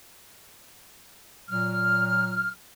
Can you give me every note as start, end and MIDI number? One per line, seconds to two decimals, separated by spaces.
1.49 2.50 46
1.49 2.50 54
1.49 2.50 89